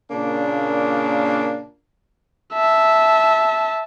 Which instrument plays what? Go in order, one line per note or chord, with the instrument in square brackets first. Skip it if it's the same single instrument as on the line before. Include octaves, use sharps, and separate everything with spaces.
[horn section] A#2 C#3 A#3 D4
[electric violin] E5 A5